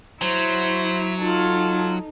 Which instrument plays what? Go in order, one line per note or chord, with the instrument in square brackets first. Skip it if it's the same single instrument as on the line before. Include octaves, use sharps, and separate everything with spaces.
[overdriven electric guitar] F#3 [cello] E4 [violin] C5
[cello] D#4 [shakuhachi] F4 [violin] A4